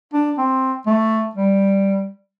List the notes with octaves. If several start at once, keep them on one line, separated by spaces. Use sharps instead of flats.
D4
C4
A3
G3